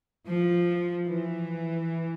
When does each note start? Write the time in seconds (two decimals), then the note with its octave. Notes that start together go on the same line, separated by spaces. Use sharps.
0.24 F3
1.07 E3